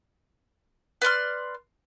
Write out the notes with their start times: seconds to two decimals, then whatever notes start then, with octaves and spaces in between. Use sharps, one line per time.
1.02 B4 D5 C6 F6